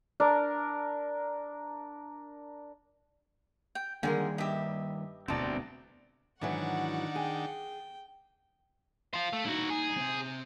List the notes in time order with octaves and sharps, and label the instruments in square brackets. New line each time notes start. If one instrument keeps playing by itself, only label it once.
[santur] D4 A#4
[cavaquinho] G5
[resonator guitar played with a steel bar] D3 G#3 A#4 [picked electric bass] D#3 G3 A#3 [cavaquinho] G#4 G5
[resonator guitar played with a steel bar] G2 G4 [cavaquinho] D#5 E5
[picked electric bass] E1 D2 B2 [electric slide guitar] C4 D5 [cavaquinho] A5 A#5
[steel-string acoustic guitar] G#2 E3 F#3 [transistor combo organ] D#3 D4 [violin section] F#5 [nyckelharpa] C#6
[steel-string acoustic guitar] G#4 [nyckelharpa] G5
[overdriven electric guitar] F4 C5 [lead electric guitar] F5
[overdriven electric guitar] A3
[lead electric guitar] G3 D#4 [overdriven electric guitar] E4 F#4
[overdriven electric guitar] G#4
[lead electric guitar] C3 C4